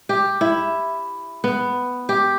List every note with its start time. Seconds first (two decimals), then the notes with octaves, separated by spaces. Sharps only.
0.09 G4
0.41 E4
1.44 B3
2.09 G4